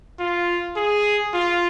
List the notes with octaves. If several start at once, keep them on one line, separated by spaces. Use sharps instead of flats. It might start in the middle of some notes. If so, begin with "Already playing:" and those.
F4
G#4
F4